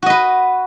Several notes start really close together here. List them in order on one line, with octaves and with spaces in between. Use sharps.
F#4 D#5 B4